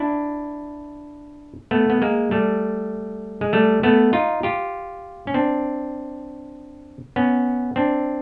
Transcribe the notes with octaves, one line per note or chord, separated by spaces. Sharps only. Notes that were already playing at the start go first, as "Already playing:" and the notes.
Already playing: D4 E4
A3 B3
B3
G#3 A#3
G3 A3
G#3
G3 A3
A3 B3
D#4 F4
F4 G4
C#4
C4 D4
B3 C#4
C4 D4